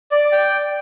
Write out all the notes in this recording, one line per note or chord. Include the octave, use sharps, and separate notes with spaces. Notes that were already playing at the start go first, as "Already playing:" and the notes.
D5
G5